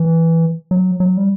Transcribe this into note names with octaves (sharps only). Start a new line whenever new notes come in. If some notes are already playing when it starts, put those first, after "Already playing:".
Already playing: E3
F#3
F#3
G3